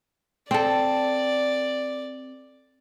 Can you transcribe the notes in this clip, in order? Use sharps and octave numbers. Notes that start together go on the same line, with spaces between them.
C4 A4 D5